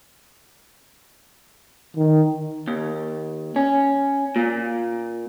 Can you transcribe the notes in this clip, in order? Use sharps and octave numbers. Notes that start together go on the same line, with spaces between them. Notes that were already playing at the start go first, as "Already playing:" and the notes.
D#3
D#2
C#4
A#2